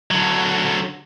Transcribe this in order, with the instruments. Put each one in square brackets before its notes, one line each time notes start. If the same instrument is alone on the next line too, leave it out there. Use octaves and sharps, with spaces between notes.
[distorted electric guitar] D3 F#3